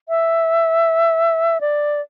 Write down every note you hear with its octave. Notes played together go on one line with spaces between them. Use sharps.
E5
D5